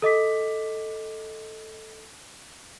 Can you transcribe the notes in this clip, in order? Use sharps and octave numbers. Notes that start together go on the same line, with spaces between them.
A4 D#5 D6 B6